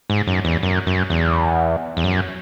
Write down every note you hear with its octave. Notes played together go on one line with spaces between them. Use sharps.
G#2
F#2
E2
F#2
F#2
E2
E2
F#2